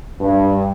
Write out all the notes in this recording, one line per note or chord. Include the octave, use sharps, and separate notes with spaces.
G2